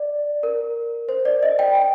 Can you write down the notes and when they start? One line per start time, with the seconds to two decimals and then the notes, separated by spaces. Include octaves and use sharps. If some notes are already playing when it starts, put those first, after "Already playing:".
Already playing: D5
0.43 A#4
1.09 C5
1.25 D5
1.43 D#5
1.59 G5
1.75 G5